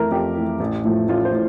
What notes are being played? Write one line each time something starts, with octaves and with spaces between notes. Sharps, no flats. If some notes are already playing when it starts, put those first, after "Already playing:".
Already playing: F2 E3 A3 A#4
F2 G4
E3 A3
A1
A2 F3 A3
A1 F4
C5
A2